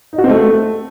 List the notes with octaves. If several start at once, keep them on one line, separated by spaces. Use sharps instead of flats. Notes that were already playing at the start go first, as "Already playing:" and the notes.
D#4
F#4
C4
A3